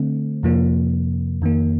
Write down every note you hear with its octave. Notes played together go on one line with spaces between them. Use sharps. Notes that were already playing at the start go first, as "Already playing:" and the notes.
Already playing: D3 A3 C4
F2 C3 F3 A#3
F2 D#3 A#3